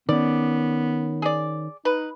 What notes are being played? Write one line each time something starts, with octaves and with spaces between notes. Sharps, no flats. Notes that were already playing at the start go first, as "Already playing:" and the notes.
D#3 B3 C#4 D5
G#4 D5
D#4 B4